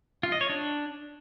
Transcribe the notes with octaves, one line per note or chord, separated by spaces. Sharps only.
F4
D#5
C#5
D4